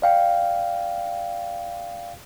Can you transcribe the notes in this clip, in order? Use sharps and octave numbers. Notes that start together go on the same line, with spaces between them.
D5 F5 G5